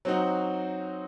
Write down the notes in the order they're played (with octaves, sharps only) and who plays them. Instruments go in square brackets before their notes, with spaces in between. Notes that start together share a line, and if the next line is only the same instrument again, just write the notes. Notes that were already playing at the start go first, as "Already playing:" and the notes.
[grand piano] F#3 C4 D#4 F#4